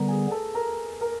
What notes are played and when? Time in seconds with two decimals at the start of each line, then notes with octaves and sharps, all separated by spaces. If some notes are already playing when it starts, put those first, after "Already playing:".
Already playing: D3 G3 B3 A#4 B4 A#5
0.08 G#4 G#5
0.31 A4 A5
0.54 A#4 A#5
1.01 A#4 A#5